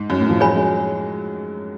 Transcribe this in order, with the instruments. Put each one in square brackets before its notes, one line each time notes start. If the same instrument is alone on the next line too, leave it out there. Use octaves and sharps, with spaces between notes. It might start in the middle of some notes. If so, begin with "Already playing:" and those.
Already playing: [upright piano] G#2
F#2
A2
F3
[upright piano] F#3 [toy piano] G#4 C#5 G#5 B5
[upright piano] G#3